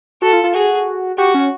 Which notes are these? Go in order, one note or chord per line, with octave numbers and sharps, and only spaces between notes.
F#4 A4
F4
F4
F#4 G#4
F#4 G4
C#4